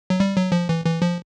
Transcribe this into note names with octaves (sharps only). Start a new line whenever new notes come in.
F#3
G3
F#3
F3
E3
E3
F3